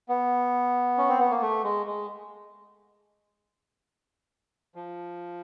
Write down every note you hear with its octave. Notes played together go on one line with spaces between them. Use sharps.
B3
C#4
C4
B3
A#3
A3
G#3
G#3
F3